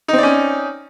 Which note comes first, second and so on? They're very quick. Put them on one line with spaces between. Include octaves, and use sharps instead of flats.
D#4 C4 D5 C#4